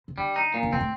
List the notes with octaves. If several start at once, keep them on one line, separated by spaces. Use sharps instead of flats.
C3
D3 G3
D#4
A#2
D3
C3 C4
A2